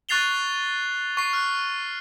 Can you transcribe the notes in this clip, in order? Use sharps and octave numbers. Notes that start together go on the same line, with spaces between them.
C#6 F#6 A6 C7 F7 G7
C#6 C7
F6 F#6